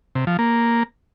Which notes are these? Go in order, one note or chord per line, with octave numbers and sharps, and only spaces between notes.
C3
F3
A#3